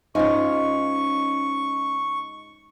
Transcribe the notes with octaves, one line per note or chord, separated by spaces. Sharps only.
G#2 C#4 D#4 F4 G#5 C#6